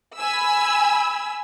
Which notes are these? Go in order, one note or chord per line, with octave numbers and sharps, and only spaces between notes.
G#5 B5 E6